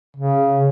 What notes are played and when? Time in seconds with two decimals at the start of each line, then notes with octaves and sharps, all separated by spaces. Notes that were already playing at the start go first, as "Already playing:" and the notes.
0.16 C#3